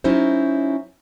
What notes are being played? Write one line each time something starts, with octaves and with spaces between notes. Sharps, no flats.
F#3 C#4 D#4 E4 F#4 C5